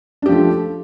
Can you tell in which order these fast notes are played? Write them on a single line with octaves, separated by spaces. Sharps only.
D4 G4 F3 A3